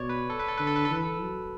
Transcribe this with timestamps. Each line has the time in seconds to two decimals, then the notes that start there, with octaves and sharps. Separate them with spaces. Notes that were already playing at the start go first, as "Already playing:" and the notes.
Already playing: B2 C#5 D5
0.09 B4
0.30 A4
0.39 B4
0.48 A4
0.57 D3 B4
0.67 A4
0.76 B4
0.85 A4
0.91 E3 B4
1.04 A4
1.21 F#3